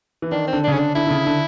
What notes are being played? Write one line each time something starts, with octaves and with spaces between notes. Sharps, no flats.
E3
D#3 D4
C4
D3
C#3 D4
D3 C#4
D4
D3 E4
D3
C#3
D3